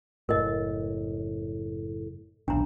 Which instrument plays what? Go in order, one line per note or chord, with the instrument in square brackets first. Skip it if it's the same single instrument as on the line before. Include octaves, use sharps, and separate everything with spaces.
[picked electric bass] F#1 A2 [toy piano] A#4 D#5
[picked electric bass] D#1 B1 [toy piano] D4 A#5